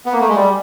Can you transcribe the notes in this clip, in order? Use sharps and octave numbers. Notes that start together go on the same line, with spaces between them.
B3
A#3
A3
G#3
G3